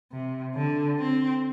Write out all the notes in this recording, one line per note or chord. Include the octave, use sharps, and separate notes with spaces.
C3
D3
C4